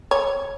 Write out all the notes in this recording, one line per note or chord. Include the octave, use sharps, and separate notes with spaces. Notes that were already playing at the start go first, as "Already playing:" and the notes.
C#5